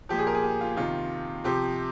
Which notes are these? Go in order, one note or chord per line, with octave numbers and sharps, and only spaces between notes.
A#2 F3 G4
G#4
A#4
G#4
G4
F4
C3 D#3 F4
C3 F3 G4